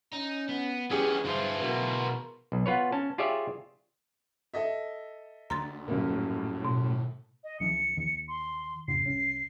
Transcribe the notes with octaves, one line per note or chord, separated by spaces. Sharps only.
C#4 D#4
B3
E3 C#4 D4 G4 G#4
G2 E3 D4 F4 C5
B2 A#4
B1
B3 F4 B4 C#5
C#4 A5
F4 G4 G#4 C#5 D5 E5
A4 D#5 E5
D2 A#5 C6 A6
D#1 F#2 A2 A#3
B2
D#5
C#2 E3 F3 C#7
D#2 D#3
C6
F2 G#2 C#3 C7
C2 C#4